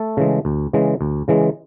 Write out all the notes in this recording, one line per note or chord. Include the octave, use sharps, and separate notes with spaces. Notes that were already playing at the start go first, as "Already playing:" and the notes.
Already playing: A3 A4
C#3 E3 G#3
D2
C#3 E3 G#3
D2
C#3 E3 G#3